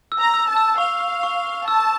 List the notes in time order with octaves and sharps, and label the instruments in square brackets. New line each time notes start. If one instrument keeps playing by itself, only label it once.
[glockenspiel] E6
[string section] A#5
[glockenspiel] E6
[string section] A5
[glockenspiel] E6
[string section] F5 [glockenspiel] C#6
[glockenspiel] C#6
C#6
C#6
[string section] A5 [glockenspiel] E6